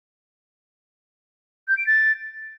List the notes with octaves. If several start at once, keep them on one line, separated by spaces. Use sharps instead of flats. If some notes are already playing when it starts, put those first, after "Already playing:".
G6
D7
A6